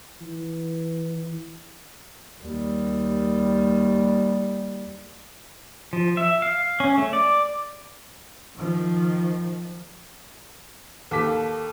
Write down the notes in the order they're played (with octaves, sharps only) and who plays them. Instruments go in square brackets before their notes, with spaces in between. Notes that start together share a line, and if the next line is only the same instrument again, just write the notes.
[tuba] E3
[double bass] D#2 G3
[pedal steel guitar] F3
E5
F5
C#4
A3
D5
[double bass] D#3 F3
[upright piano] D#2 B6 [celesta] A4 A5 D6